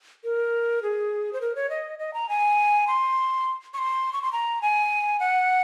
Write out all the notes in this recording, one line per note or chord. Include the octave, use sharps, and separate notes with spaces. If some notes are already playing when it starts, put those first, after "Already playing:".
A#4
G#4
C5
A#4
C#5
D#5
D#5
A#5
G#5
C6
C#6
C6
C#6
C6
A#5
G#5
F#5